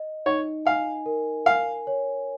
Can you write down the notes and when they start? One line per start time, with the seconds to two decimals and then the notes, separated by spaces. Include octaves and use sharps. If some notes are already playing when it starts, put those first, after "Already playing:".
Already playing: D#5
0.26 D#4 C#5
0.66 F5 G#5
1.06 A#4
1.46 F5 G#5
1.87 C#5